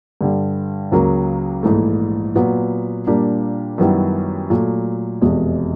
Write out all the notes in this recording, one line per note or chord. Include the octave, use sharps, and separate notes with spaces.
G2 D3 G3
C#2 C#3 F#3 A#3
A#1 G#2 E3 A3
A#2 F#3 B3
A#2 G3 A#3 D4 G4
F#2 D#3 G3 B3 E4
A#2 F#3 A3
F1 E2 B2 G#3